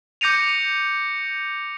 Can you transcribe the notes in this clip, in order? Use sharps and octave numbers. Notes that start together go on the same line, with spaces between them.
D6 G6 A#6 C#7 D#7 F7